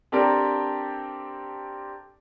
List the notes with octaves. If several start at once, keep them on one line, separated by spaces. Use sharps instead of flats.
C4 D4 G4 A4 A#4 D5